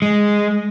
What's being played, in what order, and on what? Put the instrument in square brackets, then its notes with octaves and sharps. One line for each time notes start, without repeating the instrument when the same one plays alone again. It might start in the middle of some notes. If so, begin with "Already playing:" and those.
[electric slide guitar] G#3